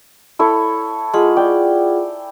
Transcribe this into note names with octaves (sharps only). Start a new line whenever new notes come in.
E4 A4 C#5
G#3 F4 G#4 F#5
D5 G5